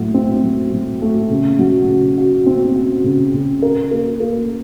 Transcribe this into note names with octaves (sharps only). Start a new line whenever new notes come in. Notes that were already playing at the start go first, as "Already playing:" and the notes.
Already playing: A2 F#3 A3
C4
F#3
F#3
A3
C#3
F#3
C#3
F#4
C4
F#4
C#3
C#3
A#4
A#3
A#3